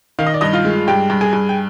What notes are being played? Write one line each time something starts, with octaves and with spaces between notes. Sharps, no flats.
D#3 F5
D#5
D5
G2 D#5
F4 F5
G#3
G2 G4 G5
G2
G#4 G#5
G2
G5